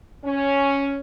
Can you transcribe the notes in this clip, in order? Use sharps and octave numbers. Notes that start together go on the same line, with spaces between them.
C#4